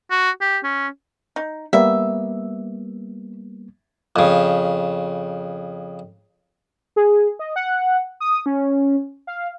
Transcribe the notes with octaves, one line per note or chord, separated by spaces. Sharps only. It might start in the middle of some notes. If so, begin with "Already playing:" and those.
F#4
G4
C#4
D#4
G3 A#3 B3 E5
F2 C#3
G#4
D#5
F#5
D#6
C#4
F5